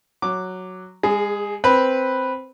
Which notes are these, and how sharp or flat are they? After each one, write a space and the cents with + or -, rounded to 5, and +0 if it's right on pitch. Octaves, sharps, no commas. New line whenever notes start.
F#3 +0 D6 +0
G#3 -35 G#4 +5
C4 +0 B4 +0